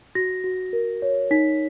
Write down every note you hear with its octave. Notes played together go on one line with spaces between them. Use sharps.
F#4 A#6
F#4
A#4
C#5
D#4 B6